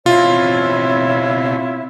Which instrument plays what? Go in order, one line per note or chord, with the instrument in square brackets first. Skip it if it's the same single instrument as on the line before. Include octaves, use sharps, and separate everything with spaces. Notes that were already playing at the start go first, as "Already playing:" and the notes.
[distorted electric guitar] B2 C4 [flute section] E4 C#5 [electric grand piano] F4